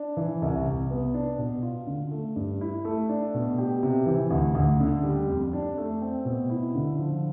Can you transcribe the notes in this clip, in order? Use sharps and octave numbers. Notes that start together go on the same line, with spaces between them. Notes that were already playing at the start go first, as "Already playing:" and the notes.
Already playing: D4
E3
C2
C2
B3
D4
B2
F4
D3
A3
G2
E4
A3
D4
B2
G4
C3
E3
D2
D2
D3
G3
F2
D4
A3
C4
B2
E4
D3
F3